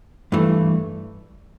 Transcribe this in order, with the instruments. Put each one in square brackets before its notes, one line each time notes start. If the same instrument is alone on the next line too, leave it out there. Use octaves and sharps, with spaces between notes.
[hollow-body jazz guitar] G2 E3 A3